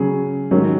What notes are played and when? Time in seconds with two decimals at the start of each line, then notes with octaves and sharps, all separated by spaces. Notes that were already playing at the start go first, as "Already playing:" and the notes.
Already playing: C#3 F#3 C#4 G#4
0.51 G#2 D#3 F#3 C#4